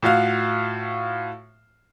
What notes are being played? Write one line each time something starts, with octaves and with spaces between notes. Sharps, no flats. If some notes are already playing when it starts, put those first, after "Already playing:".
A2 F4 F#4 F5